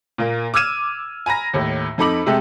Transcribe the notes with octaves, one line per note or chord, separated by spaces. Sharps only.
A#2 A#3
D6 E6 F6 G#6 D#7 E7
G#5 A#5 B5 A#6
D#2 A2
F2 D#4 A4 B5 D6 F#7
C3 G#3 A3 G4 A4